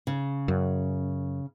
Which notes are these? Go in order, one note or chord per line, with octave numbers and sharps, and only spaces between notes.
C#3
F#2